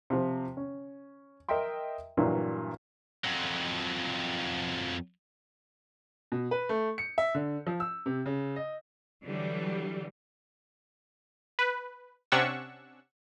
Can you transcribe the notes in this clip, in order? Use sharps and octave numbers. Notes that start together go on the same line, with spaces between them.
C3 F3
C#4
A#4 D#5 E5 G5 C6
G2 A#2 E3 F#3
F2 F#3
B2
B4
A3
C#7
E5
D3
F3
E6
C3
C#3
D#5
D3 E3 F#3 G3
B4
C3 C#4 D4 F#5 C#6 E6